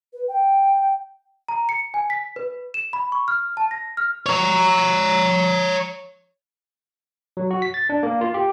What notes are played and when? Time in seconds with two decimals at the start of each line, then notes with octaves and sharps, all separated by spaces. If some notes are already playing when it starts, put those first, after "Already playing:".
0.13 B4
0.28 G5
1.49 A#5
1.69 C#7
1.94 G#5
2.10 B6
2.36 B4
2.74 E7
2.93 B5
3.12 C#6
3.28 F6
3.57 A5
3.71 A#6
3.97 F6
4.26 C#5 A#5
7.37 F#3
7.51 F#4
7.62 B6
7.74 A6
7.89 D4
8.03 A#3
8.21 F4
8.34 G4